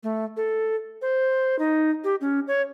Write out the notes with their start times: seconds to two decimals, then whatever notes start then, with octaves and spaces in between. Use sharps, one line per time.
0.03 A3
0.37 A4
1.02 C5
1.59 D#4
2.04 G4
2.21 C#4
2.48 C#5